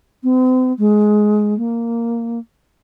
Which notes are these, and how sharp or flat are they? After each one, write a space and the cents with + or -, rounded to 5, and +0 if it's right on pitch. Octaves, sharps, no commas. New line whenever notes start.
C4 -40
G#3 +15
A#3 -5